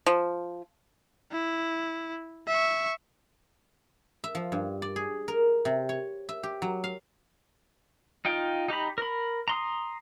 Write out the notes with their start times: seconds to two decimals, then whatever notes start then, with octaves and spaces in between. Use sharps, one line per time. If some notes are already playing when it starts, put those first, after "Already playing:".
0.06 F3
1.32 E4
2.48 E5 C#6
4.24 E5
4.35 F3
4.52 G2
4.82 D5
4.96 G#4
5.28 A#4
5.65 C3
5.89 C#5
6.29 E5
6.43 G4
6.62 F#3
6.84 F5
8.25 D#4 F4 G5
8.68 D#4 G4 A#5 B5
8.98 A#4 B5
9.48 A#5 C6 D#6